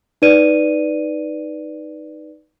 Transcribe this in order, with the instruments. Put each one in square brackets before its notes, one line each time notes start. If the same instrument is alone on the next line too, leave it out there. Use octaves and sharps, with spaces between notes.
[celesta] D#4 B4 D5 D#7